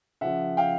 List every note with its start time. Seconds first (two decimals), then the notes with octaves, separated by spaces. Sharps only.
0.21 C#3 F3 E5 F#5
0.57 F5 G5